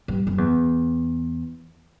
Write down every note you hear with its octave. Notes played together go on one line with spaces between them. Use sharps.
G2
F#2
E2